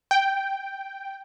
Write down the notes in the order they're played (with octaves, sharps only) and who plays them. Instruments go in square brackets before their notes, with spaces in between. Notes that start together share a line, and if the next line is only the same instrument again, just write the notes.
[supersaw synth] G5